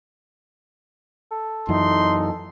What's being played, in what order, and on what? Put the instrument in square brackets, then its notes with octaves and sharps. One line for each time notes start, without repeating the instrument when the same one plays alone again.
[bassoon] A4
[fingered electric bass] F#2 E3 [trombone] D#4 [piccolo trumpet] C6